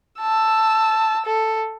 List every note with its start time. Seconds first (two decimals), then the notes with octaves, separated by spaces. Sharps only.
0.20 A5 E6
1.26 A4